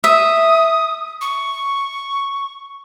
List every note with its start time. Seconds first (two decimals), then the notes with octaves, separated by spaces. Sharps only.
0.04 E5 D#6
1.21 C#6